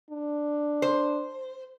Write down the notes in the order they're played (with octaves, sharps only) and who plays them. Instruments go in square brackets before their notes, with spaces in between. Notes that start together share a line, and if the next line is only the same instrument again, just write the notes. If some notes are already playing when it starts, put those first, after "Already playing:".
[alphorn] D4
[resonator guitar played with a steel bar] C5